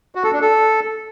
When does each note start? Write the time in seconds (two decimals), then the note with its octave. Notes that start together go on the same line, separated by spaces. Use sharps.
0.15 F#4
0.24 A4
0.33 D4
0.41 A4